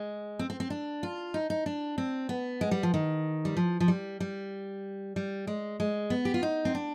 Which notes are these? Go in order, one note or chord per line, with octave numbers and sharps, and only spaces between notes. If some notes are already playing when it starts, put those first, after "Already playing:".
Already playing: G#3
C4
C4
C4
D4
F4
D#4
D#4
D4
C4
B3
G#3
G3
F3
D#3
G3
F3
F3
G3
G3
G3
G#3
G#3
B3
G4
F4
D#4
C4
D4